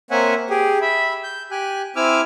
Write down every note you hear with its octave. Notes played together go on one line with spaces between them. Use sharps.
A#3 C4 C#5 E5 F#5 G#5
G4 G#4
E5 B5
G6
G4 G#5 F#6
C4 E4 G#5 D6 E6 F6